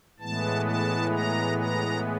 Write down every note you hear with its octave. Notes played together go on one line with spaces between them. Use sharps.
A2 E3 G#3 B3 A5
A5
A#5
A#5